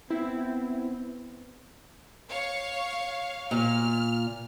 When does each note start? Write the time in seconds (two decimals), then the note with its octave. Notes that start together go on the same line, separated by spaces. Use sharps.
0.10 B3 C4 E4
2.30 C#5 F5
3.51 A#2 F6